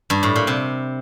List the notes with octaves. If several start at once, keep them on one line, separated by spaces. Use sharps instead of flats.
G2
A2
A#2
C3